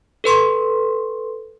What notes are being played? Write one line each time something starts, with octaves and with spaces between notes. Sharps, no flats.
A4 B4 C6 C#6